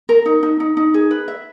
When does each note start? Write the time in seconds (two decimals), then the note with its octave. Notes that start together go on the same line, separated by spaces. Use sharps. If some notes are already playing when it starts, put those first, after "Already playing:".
0.09 A#4
0.26 D#4
0.43 D#4
0.60 D#4
0.77 D#4
0.94 G#4
1.11 B4
1.28 E5